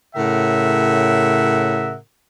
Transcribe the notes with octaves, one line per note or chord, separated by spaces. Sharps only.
A2 C#3 A#4 E5 F#5